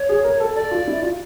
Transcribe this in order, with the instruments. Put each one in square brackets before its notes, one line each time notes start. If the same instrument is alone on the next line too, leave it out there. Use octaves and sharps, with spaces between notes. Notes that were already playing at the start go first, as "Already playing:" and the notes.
Already playing: [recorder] C#5
[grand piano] G#4
A#4
A4
[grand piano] A4 [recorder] D5
[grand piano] F4
E4
F4